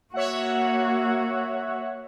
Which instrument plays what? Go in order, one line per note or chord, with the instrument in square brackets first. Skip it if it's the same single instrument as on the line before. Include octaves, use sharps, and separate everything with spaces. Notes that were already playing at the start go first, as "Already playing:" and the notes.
[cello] A#3 F#4 [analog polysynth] C#5 E5 F#5